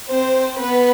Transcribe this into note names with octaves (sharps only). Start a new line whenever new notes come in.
C4 C5
B3 B4